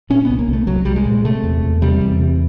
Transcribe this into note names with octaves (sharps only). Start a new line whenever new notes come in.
A#2 C#4
C2 B3
A#3
C2 A3
C2 F#3
C2 G3
G#3
A#2
C3 A3
E2
E2
C3 G3
E2
C3